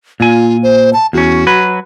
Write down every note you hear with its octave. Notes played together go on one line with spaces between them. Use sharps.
A#2 F4 G#5
C5
A5
E2 C#4 F#4
F#3 B4